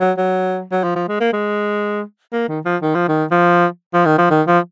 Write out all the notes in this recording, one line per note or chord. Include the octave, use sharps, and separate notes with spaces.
F#3
F#3
F#3
F3
F3
G#3
A#3
G#3
A#3
D#3
F3
D#3
F3
D#3
F3
F3
D#3
F3
D#3
F3